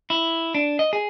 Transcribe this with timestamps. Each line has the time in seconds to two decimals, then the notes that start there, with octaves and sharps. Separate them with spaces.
0.10 E4
0.55 D4
0.79 D#5
0.93 G#4